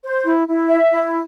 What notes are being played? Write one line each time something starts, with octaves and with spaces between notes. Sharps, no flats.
C5
E4
E4
E5
E4